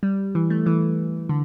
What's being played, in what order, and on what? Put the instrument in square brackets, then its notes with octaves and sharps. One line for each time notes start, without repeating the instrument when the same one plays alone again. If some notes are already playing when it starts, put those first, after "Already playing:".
[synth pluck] G3
E3
A3
E3
D3